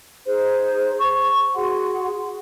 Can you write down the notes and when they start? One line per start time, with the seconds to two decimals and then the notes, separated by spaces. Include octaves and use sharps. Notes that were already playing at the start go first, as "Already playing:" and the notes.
0.27 D#4 G#4 C5
0.99 C#6
1.56 F#4 G#4 F#5 C6